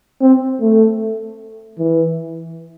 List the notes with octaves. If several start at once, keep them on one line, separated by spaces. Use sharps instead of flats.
C4
A3
E3